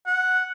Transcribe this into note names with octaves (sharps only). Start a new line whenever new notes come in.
F#5